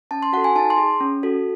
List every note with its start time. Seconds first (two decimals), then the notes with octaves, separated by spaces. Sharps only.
0.11 C#4 A5
0.23 C6
0.33 F#4 A4 F#5
0.44 G#5
0.56 D#4 A5
0.70 C6
0.78 G#4
1.01 C#4
1.23 F#4 A4